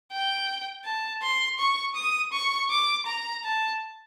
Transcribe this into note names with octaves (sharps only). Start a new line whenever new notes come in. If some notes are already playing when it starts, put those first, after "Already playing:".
G5
A5
C6
C#6
D#6
C#6
D6
A#5
A5